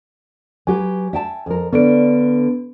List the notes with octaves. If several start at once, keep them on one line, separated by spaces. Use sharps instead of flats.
F#3 G4 B4 G#5
E5 G5 A5
F2 A#4
D3 B3 D4 B4 D7